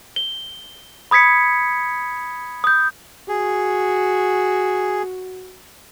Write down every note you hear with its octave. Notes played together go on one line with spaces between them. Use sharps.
G7
B5 D#6 G#6 B6 C#7
D#6 G6
F#4 G#4